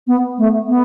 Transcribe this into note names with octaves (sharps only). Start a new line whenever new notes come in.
B3
A3
B3